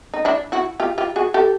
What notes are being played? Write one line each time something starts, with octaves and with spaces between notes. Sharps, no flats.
D#4
D4 E4
E4 F#4
F4 G4
F4 G4
F#4 G#4
G4 A4